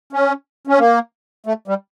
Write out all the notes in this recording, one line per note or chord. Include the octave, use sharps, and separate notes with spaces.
C#4
C#4
A#3
A3
G3